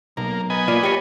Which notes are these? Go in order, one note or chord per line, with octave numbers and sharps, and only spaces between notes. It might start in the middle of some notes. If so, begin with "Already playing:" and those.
B1 A#3
B3 D#5 G#5
A#3 F4 D5
G4 C#5